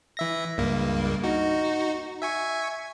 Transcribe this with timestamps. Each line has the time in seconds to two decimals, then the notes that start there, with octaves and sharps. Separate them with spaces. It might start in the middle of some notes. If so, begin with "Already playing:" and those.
0.17 E3 E5 A#6
0.58 C#2 G2 A#3
1.23 D#4 F#4
2.22 E5 G#5 C#6